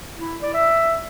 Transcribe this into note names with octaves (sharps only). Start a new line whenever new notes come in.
E4
D5
E5